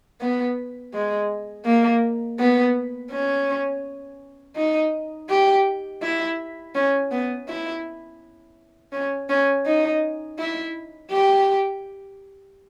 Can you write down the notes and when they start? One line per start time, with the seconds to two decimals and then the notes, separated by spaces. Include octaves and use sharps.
0.21 B3
0.93 G#3
1.65 A#3
2.39 B3
3.11 C#4
4.56 D#4
5.29 G4
6.02 E4
6.75 C#4
7.11 B3
7.48 E4
8.92 C#4
9.29 C#4
9.66 D#4
10.38 E4
11.11 G4